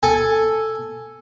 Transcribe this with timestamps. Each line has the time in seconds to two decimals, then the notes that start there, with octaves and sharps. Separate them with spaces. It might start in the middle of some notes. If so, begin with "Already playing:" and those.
0.03 A4 G#5